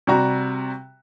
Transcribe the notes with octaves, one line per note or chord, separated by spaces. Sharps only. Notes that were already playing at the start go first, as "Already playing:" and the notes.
C3 G3 F#4 A#5